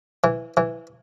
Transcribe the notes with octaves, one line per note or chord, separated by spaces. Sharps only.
E3
E3